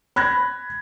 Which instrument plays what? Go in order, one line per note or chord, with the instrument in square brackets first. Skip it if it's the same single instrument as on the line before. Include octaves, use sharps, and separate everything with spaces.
[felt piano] B5 F#6 G#6 A#6